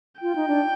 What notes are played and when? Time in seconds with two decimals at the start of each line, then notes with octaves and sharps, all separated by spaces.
0.21 F4 G5
0.36 D#4
0.48 D4